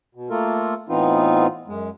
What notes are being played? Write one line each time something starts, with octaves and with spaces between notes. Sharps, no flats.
B2
A3 A#3 F4 A4 A#4
A2 E3 B3 C4 D#4 F4
F#2 G#3